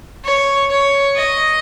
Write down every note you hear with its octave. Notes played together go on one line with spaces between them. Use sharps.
C#5
C#5
D#5